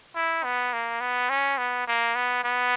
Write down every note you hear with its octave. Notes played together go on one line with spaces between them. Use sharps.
E4
B3
A#3
B3
C#4
B3
A#3
B3
B3